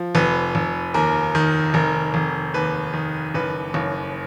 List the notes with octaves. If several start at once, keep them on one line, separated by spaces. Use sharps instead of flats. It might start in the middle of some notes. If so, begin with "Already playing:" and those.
Already playing: F3
F1 B4
F1
D#2 A#4
D#3
F1 A#4
F1
D#2 B4
D#3
F#1 B4
F#1 C#5